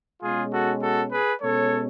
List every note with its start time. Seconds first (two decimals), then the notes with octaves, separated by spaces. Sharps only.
0.23 B2 G#3 C#4 F4 G#4
0.52 F#4 A4
0.83 F#4 A4
1.12 G#4 B4
1.42 B2 G#3 C#4 A4 C#5